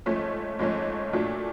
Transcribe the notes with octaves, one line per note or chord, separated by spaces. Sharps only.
G#2 F3 A3 C#4
G#2 F3 A3 C#4
A#2 F#3 A3 D4